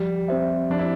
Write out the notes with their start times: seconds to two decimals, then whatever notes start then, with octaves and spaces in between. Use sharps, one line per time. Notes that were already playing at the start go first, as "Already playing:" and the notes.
Already playing: F3 G3
0.28 C4 G4 C5 E5
0.70 F3 D4
0.79 E4